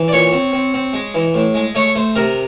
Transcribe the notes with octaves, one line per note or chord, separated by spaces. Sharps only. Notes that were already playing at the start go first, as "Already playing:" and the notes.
Already playing: E3
D5
A#2 C#5
C4
C4
C4
G#3
E3
A2
G#3
A3 C#5
A3 C5
C3 A#4